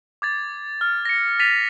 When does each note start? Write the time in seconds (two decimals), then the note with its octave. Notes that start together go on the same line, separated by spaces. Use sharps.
0.22 D6 G#6 A6
0.81 F6
1.05 A#6 C#7
1.39 A6 B6 D#7 F7